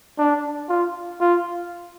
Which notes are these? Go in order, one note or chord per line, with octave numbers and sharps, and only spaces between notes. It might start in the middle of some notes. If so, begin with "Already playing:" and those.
D4
F4
F4